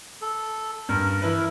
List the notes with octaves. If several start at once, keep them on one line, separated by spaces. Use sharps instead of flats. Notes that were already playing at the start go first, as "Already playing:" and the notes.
A4
G2 A#4
E3 E4 B4